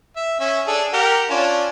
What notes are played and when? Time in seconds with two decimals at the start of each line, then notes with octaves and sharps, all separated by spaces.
0.16 E5
0.40 C#4 E5
0.67 D4 G#4 A4
0.93 G4 A#4 F#5
1.30 C#4 D4 F4